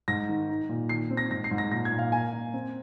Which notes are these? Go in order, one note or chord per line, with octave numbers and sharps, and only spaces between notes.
G#2 A#6
D#3
D#4
A#2
D#3 C7
C4
A#6
G#2 A#6
C7
G#2
A#6
A#2 A#6
G#6
A#2
F5
A#3 G#5
A#3
C4